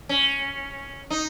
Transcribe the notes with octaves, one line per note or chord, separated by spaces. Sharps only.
C#4
D#4